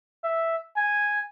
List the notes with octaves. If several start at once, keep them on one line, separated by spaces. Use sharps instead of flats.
E5
G#5